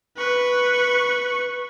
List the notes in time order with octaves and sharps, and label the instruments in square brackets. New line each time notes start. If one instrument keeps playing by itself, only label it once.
[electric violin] B4 C#6